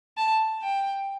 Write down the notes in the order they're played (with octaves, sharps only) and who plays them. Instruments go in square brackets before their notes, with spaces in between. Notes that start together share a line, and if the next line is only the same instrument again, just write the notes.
[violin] A5
G5